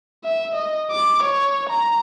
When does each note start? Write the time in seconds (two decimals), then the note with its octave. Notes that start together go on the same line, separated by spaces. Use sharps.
0.25 E5
0.55 D#5
0.91 D6
1.23 C#5
1.69 A#5